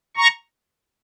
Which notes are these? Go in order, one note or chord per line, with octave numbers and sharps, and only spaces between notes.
A#5 C#6